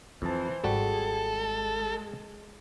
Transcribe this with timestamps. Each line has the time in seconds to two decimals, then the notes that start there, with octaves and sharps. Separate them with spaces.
0.22 F2 E3 D#4 C5 A5
0.64 G#1 G3 F#4 G#4 A4
1.18 G#3